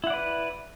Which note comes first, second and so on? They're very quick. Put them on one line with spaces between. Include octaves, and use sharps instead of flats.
E4 F#5 D5 B4